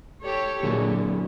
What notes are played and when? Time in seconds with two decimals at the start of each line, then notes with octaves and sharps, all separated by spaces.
0.22 G4 A4 C#5
0.63 A#2 D3 F#3 G#4 A#4